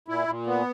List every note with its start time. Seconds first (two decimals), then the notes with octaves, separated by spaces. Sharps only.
0.08 A#2 E4
0.28 A#2
0.47 B3